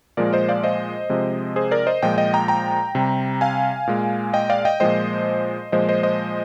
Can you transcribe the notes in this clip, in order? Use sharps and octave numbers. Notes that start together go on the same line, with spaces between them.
A#2 F3 G#3 A#4 D5
C5 D#5
D5 F5
C5 D#5
C3 F3 G#3
G#4 C5
A#4 D5
C5 D#5
A#2 F3 G#3 D#5 G5
D#5 G5
G5 A#5
G5 A#5
C3 G3
F5 G#5
A#2 G#3
D#5 G5
D5 F5
D#5 G5
A#2 F3 G#3 C5 D#5
A#2 F3 G#3 C5 D#5
C5 D#5
C5 D#5